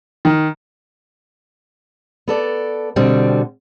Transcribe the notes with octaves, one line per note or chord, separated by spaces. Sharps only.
D#3
B3 A4 D5
B2 D3 G3 C4